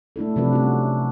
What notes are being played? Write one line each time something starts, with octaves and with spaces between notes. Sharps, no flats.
A3 D4 E4 A4
C3 F3 F#3 D4 F#4 B4
G3 A3 C#4 D#4 F#4